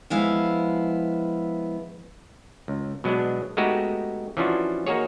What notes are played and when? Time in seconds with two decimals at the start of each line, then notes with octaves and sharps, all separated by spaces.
0.10 F3 G#3 B3 E4 F5
2.68 C#2
3.04 B2 F#3 G#3 B3 D4
3.57 G#3 A3 B3 D#4 F#4 G4
4.37 E3 F3 C#4 D4 F4 F#4
4.87 A#3 D#4 F#4 G#4 C#5